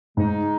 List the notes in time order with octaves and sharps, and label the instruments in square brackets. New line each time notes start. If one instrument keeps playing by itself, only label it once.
[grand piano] G#2 [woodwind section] C#3 G#3 D#4